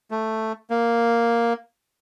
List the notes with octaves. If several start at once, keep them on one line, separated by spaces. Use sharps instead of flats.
A3
A#3